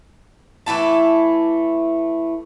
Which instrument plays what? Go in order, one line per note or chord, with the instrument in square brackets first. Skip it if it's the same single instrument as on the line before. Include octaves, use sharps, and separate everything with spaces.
[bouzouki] E3 A3 E4 A5